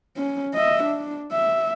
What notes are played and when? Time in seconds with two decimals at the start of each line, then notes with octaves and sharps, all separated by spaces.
0.17 C#4
0.54 D#5 E5
0.84 D4
1.32 E5